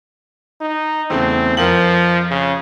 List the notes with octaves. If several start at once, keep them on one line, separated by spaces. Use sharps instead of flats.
D#4
E2 C#3 A3 C4
F2 F3 A#4 F#7
C#3